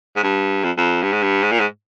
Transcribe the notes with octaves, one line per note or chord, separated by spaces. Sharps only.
G#2
G2
F2
F2
G2
G#2
G2
G#2
A#2
G#2